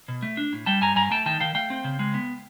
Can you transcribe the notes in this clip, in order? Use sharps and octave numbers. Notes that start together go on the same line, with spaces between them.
B2
A3
D4
A2
G3 G5 A5
G2 G#5 A#5
G2 G#5 A#5
A3 G5 A5
D#3 G5 A5
D#3 F5 G5
A3 F5 G5
C4
C#3
G#3
B3